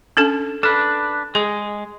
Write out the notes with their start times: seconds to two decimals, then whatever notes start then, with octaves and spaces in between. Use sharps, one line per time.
0.17 C#4 D4 A4
0.63 D4 A4 B4
1.35 G#3 G#4